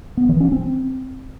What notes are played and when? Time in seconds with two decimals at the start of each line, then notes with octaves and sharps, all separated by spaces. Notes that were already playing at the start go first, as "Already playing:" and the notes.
0.17 B3
0.29 E3
0.40 C#4
0.52 C4